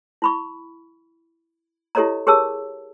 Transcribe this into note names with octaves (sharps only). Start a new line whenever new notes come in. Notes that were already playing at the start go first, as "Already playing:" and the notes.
E4 B5 C#6
E4 G4 A4 C#5 D#5 A#5
G4 G#4 A#4 C#5 A5 E6